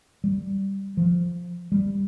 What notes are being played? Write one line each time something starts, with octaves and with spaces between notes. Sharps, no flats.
G3
F3
G3